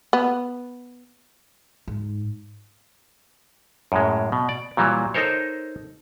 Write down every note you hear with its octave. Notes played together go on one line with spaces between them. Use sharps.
B3
G#2
F#2 A2 G#3
B2
D5
A#2 E3 F#3 G3
D#4 A4 A#4 C5 C#5